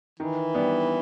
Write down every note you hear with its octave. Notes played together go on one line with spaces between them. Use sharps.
D#3 E3
G3 B3 D4